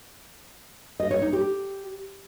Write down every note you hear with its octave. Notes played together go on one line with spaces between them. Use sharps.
D#5
C#5
D#4
G4